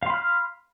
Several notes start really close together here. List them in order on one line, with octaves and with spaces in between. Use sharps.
F5 C6 B5 F6